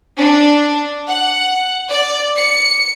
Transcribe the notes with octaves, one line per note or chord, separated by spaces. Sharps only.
D4
F#5
D5
C#7